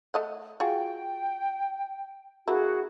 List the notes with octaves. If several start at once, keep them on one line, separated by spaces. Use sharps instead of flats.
A3 D#5 F#5
F4 F#4 G#4 G5
D3 A#3 E4 F#4 G#4